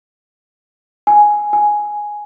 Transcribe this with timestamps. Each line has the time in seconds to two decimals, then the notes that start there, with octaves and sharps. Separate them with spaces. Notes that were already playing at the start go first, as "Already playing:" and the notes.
1.07 G#5
1.53 G#5